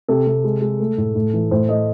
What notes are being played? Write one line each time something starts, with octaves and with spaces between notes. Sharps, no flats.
C3 A4
C3
G#3
G#3
A3
A2
A2
E3
A2 C5
A3 D#5